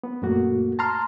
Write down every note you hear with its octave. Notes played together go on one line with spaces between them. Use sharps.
B3
F#2 A#2 A3 A#3 F#4
A5 A#5 C6 F6